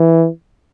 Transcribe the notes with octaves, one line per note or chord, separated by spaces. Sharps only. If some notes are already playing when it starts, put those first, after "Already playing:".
Already playing: E3